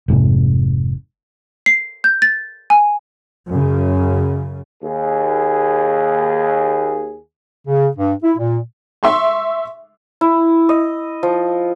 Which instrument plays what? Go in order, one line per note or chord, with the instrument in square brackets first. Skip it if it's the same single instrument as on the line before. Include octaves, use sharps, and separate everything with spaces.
[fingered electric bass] F1 G#2 C3
[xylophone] C7
G6
A6
G#5
[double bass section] F#2 C#3
[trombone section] D#2 G#4
[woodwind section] C#3
G2
E4
A#2
[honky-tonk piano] E5 C6 C#6
[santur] E4
D#5
F3